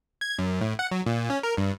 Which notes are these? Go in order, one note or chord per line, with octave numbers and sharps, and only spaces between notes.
G#6
F#2
A2
F#5
F#3
A#2
C#4
A#4
G2